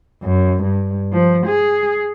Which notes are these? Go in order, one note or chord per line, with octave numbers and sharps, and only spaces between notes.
F#2
G2
F3
G#4